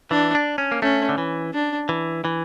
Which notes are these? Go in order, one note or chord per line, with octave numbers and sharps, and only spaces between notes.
E3 D4
D4
C#4
A#3
A3 C#4
D3
E3
D4
E3
E3